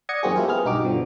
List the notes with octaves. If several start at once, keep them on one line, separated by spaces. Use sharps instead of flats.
D5 F#5 D#6 G#6 A#6 C#7
F#2 E3 A#3 C4 F#4 G#4
G#3 E4 F4 G4 A#4
B3 G#4 F6
B1 G2 D#4 F#4 G4 D6
G2 B2 D3 F3